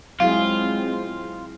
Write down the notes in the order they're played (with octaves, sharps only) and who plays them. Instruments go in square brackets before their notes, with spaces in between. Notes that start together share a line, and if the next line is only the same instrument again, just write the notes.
[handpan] F#3 E4 G#4 [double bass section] G#3 C4 [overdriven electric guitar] F4 [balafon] F5